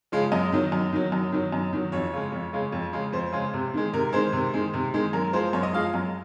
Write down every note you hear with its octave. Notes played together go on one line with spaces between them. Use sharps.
C#3 F3 G#3
F#2 D#5
D#3 F#3
F#2
D#3 F#3
F#2
D#3 F#3
F#2
D#3 F#3
F2 C#5
C#3 G#3
F2
C#3 G#3
F2
C#3 G#3
F2 C5
C#3 G#3
C3
D#3 G#3
C3 A#4
D#3 G#3 C5
C3
D#3 G#3
C3
D#3 G#3
F#2 A#4
F3 G#3 C5
F#2 C#5
D#5
F3 G#3 F5
F#2